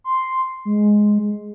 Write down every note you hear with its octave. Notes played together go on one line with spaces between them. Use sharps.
C6
G#3